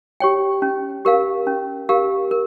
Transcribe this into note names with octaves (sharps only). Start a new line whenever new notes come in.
G4 C#5 G5
C#4
G4 A#4 F5
C#4
G4 A#4 F5
A#4